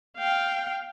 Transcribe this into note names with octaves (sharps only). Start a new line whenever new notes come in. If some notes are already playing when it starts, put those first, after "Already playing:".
F5 G5